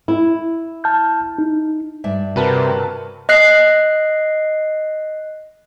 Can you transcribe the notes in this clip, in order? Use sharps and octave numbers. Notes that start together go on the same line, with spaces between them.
E4
A5 F6 G6
D#4
G2 D5 E5
C3 F#4 A#4 B4 A5
D#5 F#6 C7